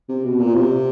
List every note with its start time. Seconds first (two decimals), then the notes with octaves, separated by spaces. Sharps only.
0.09 C3
0.24 B2
0.40 A#2
0.55 C3